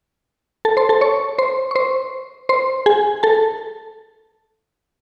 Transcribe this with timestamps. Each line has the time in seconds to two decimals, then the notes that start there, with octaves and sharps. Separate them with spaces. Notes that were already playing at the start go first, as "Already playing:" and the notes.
0.65 A4 A5
0.77 C5 C6
0.89 A4 A5
1.01 C#5 C#6
1.38 C5 C6
1.71 C#6
1.76 C5 C6
2.49 C5 C6
2.86 G#4 G#5
3.23 A4 A5